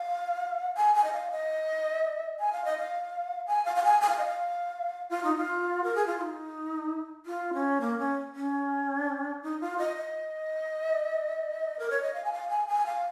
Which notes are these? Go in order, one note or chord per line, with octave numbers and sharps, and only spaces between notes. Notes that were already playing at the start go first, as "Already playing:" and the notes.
Already playing: F5
G#5
G#5
D#5
F5
D#5
G#5
F5
D#5
F5
G#5
F5
F5
G#5
G#5
F5
D#5
F5
F4
D#4
F4
A#4
G#4
F4
F4
D#4
F4
C#4
A#3
C#4
C#4
D#4
F4
D#5
D#5
A#4
C#5
D#5
F5
G#5
F5
G#5
G#5
F5